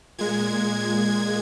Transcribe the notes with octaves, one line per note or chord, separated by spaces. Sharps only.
A#2 G#3 G#6